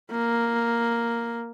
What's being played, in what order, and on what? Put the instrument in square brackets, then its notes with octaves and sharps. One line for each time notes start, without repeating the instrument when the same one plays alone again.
[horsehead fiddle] A#3